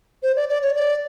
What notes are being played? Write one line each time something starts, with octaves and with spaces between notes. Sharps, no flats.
C5
D5
D5
C#5
D5